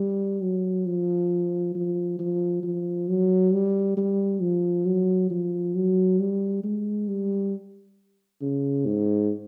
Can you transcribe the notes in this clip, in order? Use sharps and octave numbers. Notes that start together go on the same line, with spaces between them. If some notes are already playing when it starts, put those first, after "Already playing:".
Already playing: G3
F#3
F3
F3
F3
F3
F#3
G3
G3
F3
F#3
F3
F#3
G3
G#3
G3
C#3
G#2